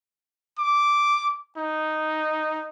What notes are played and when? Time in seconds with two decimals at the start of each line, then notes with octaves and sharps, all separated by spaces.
0.59 D6
1.57 D#4